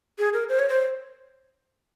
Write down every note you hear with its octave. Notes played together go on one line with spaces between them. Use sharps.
G#4
A#4
C5
C#5
C5